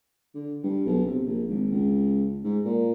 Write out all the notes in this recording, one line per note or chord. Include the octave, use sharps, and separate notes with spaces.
D3
G2
B1
C3
A#1
G#1
C#2
G#2
A#2